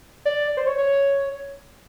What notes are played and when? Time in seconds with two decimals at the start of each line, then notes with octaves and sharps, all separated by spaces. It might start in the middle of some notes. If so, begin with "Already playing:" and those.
0.25 D5
0.57 C5
0.67 C#5
0.78 C#5